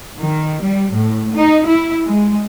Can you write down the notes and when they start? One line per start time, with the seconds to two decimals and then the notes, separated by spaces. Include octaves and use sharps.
0.18 D#3
0.62 G3
0.93 A2
1.33 D#4
1.65 E4
2.05 G#3